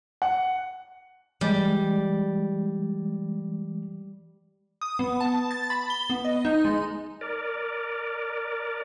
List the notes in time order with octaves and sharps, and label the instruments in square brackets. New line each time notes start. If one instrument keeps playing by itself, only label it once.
[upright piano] F#5
[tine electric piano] E3 G#3 [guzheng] G3
[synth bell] D#6
B3
A5
A6
B5
G7
B3
D#5
D#4
G#3
[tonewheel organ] A#4 D5